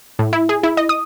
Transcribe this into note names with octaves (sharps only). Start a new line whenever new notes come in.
A2
E4
G#4
E4
D#5
D#6